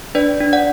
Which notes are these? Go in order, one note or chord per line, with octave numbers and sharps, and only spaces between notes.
D4 B4 D5
D4
D5 F#5